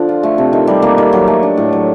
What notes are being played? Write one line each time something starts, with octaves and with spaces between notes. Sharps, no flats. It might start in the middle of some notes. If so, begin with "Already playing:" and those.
Already playing: D3 F3 D4
F4
A3
C3
D#3
G3
A#3
D#3
F#3
A3
D4
A2
F#3